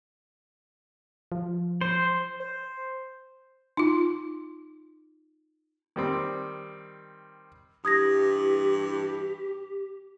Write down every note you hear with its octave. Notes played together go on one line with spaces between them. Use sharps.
F3
C5
C5
D#4 F4
D#3 G3 C4
G2 E3 G4 D#6 G#6 A#6